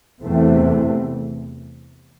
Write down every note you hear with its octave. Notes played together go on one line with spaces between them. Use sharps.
E2 C3 E3 A3 C4